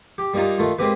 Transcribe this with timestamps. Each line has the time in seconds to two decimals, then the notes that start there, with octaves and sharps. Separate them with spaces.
0.18 G4
0.34 G3 A#3 D#4 F4 A#5
0.58 D#3 A3 F4
0.78 G#3 A#3 C4 G4 B4